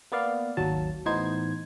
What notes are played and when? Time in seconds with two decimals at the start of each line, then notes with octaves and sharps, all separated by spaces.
0.12 A#3 B3 D5 F5
0.57 G#1 D#2 F#3 A5
1.06 A2 E3 B3 D#4 C5 G#6